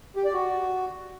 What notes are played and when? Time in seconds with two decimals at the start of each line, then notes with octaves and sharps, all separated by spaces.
0.16 G4
0.25 D5
0.33 F#4